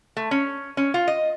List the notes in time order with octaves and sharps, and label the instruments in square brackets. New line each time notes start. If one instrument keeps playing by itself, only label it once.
[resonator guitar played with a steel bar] A3
C#4
C#4
F4
D#5